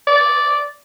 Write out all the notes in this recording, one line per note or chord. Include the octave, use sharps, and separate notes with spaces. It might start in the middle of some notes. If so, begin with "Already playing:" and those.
D5